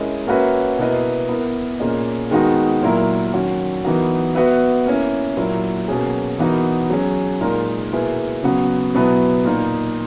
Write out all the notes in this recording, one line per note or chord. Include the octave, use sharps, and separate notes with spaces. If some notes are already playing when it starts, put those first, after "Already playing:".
Already playing: G#3 C#4 E4 A#4 D#5
A#3 C#4 F#4 B4 E5
B2 A#3 E4 B4 D#5
B3 E4 A#4
A#2 A#3 C#4 G#4 D#5
D#3 G#3 B3 D#4 F#4
A#2 F#3 A#3 E4 A#4
D#3 F#3 C#4 F#4
E3 B3 D#4 F#4 A#4
B3 F#4 B4 E5
A#3 C#4 E4
A#2 F#3 A#3 E4
B2 F#3 A#3 C#4 G#4
E3 B3 D#4 F#4 A#4
F#3 C#4 G#4
A#2 G#3 D#4 A#4
B2 A#3 E4 G#4 B4
C#3 F#3 B3 F#4
B2 F#3 B3 E4 B4
A#2 A#3 D#4